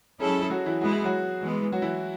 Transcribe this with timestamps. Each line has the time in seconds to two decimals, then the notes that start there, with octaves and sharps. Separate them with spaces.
0.20 F#3 G#3 C#4 E4 G#4 A4
0.42 G#4
0.50 F#3 F#4
0.66 E3 E4
0.81 G#3 B3 E4 F#4
0.92 G#4
1.04 F#3 F#4
1.42 E3 G#3 B3
1.72 F#3 F#4
1.82 E3 E4